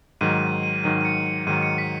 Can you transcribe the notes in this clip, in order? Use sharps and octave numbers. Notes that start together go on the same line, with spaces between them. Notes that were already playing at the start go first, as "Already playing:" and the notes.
G#2 D#3 F#3 D#7
D#7
G#2 D#3 F#3 D#7
D#7
C#7
C#7
G#2 D#3 F#3 D#7
C#7
B6